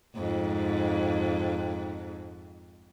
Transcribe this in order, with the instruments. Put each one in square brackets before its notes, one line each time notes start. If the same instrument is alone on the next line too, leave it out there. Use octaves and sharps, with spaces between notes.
[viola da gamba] F2 G#2